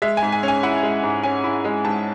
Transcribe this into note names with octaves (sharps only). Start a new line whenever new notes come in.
G#3 E5
G#5
G#2
G#5
C#4
G#5
E4 F#5
G#3
G#2
C#4 G#5
E4
G#3
G#2 A5